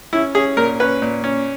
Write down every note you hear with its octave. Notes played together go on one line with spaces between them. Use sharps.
C#4 E4
C#4 G#4
A#2 A#4
C#4 B4
A#2
C#4